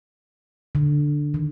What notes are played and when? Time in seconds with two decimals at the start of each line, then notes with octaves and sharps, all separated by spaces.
0.75 D3
1.34 D#3